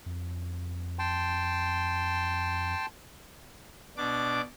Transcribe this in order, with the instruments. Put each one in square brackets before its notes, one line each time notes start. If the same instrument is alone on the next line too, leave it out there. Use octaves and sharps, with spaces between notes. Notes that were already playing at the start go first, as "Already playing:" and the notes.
[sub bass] F2
[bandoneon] G5 A5 C6
[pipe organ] B2 D4 D6